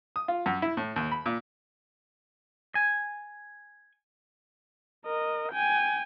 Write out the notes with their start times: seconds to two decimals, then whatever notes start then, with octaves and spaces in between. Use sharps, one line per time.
0.16 D#6
0.28 F4
0.46 F#2
0.62 E4
0.77 A2
0.96 D#2
1.12 B5
1.26 A#2
2.75 G#5
5.05 A#4 D#5
5.52 G5 G#5